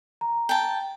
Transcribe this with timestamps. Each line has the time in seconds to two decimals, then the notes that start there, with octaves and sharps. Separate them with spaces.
0.21 A#5
0.49 G5 A5